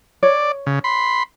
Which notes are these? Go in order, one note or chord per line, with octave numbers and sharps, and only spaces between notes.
C#5 D5
C#3
B5 C6